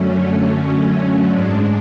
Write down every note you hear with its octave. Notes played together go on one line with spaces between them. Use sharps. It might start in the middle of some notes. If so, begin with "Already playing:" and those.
Already playing: F#2 D3 F#3 A3 C#4
G#2 G#3 D4